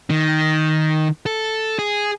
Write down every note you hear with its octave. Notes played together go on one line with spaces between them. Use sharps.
D#3
A4
G#4